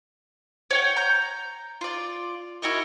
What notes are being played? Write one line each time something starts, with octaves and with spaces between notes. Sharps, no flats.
C#5 F#5 G5
A#5 G6
F4 D5
E4 F#4 A#4 D#5